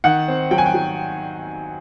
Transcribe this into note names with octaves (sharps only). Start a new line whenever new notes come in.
D#3 F#5
C4
F#3 G5
G#5
G5
F#3